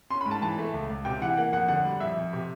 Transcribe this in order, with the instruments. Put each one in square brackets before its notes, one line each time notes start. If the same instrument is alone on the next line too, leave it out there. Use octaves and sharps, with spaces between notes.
[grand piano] C#4 [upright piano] C6
[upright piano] B5
[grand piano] G#2
[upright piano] A5
[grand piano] E3 [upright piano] A5
[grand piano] A3
C#2
C#2
[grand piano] C3 [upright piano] G5
[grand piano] E3 [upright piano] F#5
[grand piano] A#3 [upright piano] F#5
[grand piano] F2 [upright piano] F#5
[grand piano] D3 [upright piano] F#5
[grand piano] G3
[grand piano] F2 [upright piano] E5
[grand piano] F2
C3